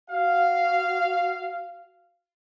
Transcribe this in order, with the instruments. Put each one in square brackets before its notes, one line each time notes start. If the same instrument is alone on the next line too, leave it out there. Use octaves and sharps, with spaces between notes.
[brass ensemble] F#4 F5